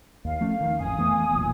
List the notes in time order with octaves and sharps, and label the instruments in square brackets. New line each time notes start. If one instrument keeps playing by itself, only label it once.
[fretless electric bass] D#2 [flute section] F5
[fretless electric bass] F3 A3 C#4
D#3
[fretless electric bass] A1 F2 [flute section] G#5 D#6
[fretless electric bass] E3 A3 B3
E1 B1 A#2